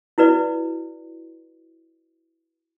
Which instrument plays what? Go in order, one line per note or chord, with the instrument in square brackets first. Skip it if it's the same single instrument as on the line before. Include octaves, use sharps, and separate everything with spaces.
[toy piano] E4 F#4 B4 D5